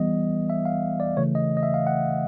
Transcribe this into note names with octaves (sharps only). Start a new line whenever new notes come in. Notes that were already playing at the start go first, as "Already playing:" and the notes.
Already playing: E3 G3 B3 D#5
E5
F5
D5
C#3 E3 A3 C#5
D#5
D#5
E5
F5
F#5